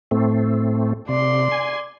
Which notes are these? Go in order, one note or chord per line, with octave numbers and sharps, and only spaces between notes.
A2 A3 C4
C3 D5 C6
G#5